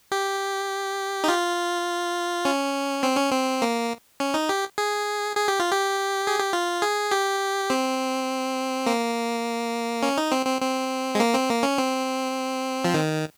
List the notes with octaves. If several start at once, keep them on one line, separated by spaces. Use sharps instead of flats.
G4
D#4
F4
C#4
C4
C#4
C4
A#3
C#4
D#4
G4
G#4
G#4
G4
F4
G4
G#4
G4
F4
G#4
G4
C4
A#3
C#4
D#4
C4
C4
C4
G#3
A#3
C4
A#3
C#4
C4
F3
D#3